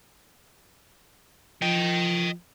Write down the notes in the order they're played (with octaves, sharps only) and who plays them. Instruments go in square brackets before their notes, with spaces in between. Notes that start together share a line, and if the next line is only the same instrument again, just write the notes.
[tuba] F3 [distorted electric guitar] D#5 G5